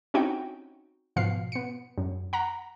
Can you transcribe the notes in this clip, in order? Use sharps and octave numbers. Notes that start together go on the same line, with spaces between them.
C4 C#4 D#4 E4 F#4 G5
G#2 B2 F3 F5 C7
B3 C#7
F#2
F#5 A#5